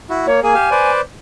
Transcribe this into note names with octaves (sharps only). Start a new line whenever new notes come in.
E4 F#4
A#3 C#5
A#3 G#4 G#5
G4 F5
B4 C5 D5